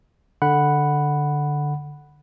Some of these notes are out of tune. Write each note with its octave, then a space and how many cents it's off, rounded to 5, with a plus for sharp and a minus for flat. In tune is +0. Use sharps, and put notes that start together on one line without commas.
D3 +0 F#5 +0 B5 +0